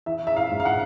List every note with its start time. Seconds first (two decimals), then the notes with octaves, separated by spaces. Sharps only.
0.06 E3 E5
0.27 E5
0.36 F5
0.51 G#2
0.60 F5
0.65 F#5